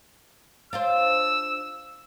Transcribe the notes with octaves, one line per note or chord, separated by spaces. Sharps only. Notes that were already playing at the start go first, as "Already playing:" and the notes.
D4 F4 C5 E6